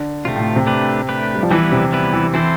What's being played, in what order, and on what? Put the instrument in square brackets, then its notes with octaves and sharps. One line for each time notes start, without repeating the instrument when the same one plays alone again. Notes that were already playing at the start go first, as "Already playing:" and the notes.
Already playing: [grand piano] D3
[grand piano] C3 [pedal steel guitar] A3 C4 F4
[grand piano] A2
C3
[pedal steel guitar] A3 D4 G4 B4
A3 D4 G4 B4
[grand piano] G3
F3
[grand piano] E3 [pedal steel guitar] G3 B3 E4 B4
[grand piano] C3
[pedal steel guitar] G3 B3 E4 B4
[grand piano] E3
[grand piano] E3 [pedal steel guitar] C4 E4 A4 C5